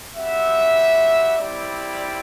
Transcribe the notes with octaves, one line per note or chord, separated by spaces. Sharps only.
G3 C4 F#4 E5
G3 C4 E4 G4 D5